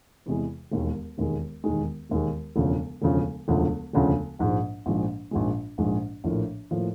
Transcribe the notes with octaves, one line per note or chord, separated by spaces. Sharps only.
E2 C3 E3 G#3
E1 D#2 D#3 G#3
E1 D#2 D#3 G#3
E1 D#2 D#3 G#3
E1 D#2 D#3 G#3
E1 D2 C#3 F3
E1 D2 C#3 F3
E1 D2 C#3 F3
E1 D2 C#3 F3
A#1 G#2 F3 G#3
A#1 G#2 F3 G#3
A#1 G#2 F3 G#3
A#1 G#2 F3 G#3
A#1 A2 F3 A#3
A2 F3 A#3